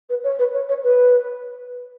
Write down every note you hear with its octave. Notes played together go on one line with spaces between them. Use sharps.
B4
C#5
B4
C#5
C#5
B4